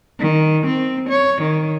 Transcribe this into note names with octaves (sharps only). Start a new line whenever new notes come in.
D#3
C4
C#5
D#3